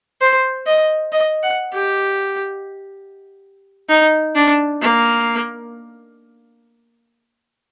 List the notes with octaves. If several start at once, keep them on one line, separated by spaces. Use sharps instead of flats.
C5
D#5
D#5
F#5
G4
D#4
D4
A#3